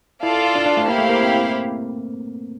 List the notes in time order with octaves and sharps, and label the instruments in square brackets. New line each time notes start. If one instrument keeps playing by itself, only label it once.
[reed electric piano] E4 [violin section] F4 A4 D5 F5 A5
[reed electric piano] D4
D4
A3
[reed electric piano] A#3 [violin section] E4 G4 C5 F5
[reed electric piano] A3
A#3
C4